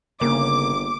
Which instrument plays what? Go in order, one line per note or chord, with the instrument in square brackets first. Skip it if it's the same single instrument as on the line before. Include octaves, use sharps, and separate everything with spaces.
[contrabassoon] G1 [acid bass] C#3 [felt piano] A#3 [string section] D6